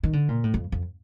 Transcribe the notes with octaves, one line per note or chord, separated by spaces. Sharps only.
D#3
D3
A#2
A2
F2
F2